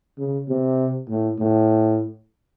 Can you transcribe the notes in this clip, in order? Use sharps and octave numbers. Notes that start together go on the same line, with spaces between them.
C#3
C3
A2
A2